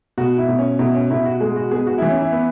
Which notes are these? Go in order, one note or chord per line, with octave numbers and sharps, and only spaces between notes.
B2 F#4
E4
B2
C#4
B2 E4
C#4
B2 E4
F#4
G#3 G#4
F#4
B3 G#4
F#4
E3 E4
C#4
E4
B3